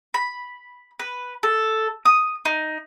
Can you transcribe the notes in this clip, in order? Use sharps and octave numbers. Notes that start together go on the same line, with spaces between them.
B5
B4
A4
D#6
D#4